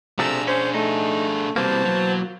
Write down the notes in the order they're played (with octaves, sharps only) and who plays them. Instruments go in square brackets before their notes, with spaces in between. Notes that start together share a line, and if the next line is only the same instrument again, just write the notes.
[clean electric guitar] C3 F3 A3 [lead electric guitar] D4 G#4 [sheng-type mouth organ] A#5 E6
[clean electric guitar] C#4 [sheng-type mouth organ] C5
[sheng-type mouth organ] A3 [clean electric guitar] D#4
[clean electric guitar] B2 E3 A#3 [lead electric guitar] G3 C4 [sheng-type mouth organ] C5 A5
[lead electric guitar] F#3